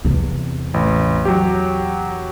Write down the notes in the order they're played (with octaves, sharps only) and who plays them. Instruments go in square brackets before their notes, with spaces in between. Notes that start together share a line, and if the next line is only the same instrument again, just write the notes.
[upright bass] E2 C3
[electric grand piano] A1
F#3 G4